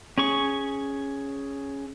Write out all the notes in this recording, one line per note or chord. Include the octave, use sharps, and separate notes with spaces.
C#4 G#4 C#6